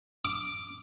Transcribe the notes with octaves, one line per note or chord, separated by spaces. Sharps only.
D6